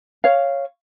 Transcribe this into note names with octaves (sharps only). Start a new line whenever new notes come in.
C#5 F5